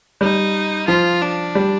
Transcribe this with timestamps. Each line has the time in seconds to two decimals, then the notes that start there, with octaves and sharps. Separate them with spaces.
0.21 G3 D#4
0.88 F3 F4
1.22 D4
1.55 G3